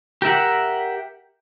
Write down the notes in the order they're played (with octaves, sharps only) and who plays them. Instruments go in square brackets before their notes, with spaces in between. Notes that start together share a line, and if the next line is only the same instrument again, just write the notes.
[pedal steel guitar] G4 A#4 E5 F#5